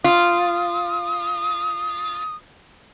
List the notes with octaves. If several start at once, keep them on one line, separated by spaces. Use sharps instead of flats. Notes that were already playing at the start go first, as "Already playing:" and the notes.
F4 D#6